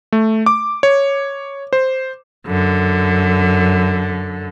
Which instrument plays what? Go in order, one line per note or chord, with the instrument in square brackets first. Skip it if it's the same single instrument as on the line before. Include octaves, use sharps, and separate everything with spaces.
[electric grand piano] A3
D6
C#5
C5
[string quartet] F#2 D3